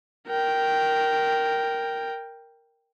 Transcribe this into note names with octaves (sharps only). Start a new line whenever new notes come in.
A#4 G5